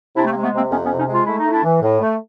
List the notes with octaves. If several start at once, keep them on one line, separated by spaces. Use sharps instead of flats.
C3 D4 E4
A3
A#3
G#3
A3 B3
C3 A#3 C4
F2 B3 C#4
B3 C#4
C3
C#4 D#4
G#3 F4
A3 E4
D#4
A3
D4 E4
E3
A2
A3